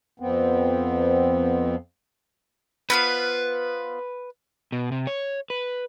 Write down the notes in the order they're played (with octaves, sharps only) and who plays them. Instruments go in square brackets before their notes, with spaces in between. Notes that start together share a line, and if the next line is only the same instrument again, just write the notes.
[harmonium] F2 B3 C4
[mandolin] B3 F4 C5 [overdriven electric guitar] B4
[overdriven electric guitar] B2
C3
C#5
B4